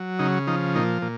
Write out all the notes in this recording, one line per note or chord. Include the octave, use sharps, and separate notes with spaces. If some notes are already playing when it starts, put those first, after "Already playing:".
Already playing: F#3
C#3 D#4
F3 D#4
A#2 D#4
A#2